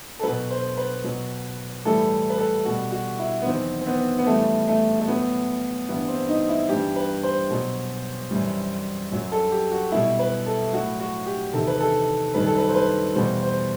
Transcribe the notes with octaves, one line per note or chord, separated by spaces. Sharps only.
A4
B2 F#3 B4
C5
B4
B2 F#3
A2 E3 G3 A4
B4
A4
B2 G3 F#4
F#4
E4
B3
E2 D#3 F#3 C4
C4
B3
B3
A2 E3 G3 A3
A3
A3
A2 F#3 B3
G2 E3 G3 B3
C4
D#4
E4
G2 E3 G3 G4
B4
C5
B2 F#3
F#2 E3 G3
F#2 F#3
A4
G4
F#4
B2 G3 E4
B4
A4
A2 F#3 F#4
F#4
G4
E2 C3 D#3 A4
B4
A4
F#2 D#3 G3 B4
A4
B4
C5
B4
E2 B2 G3 C5
C5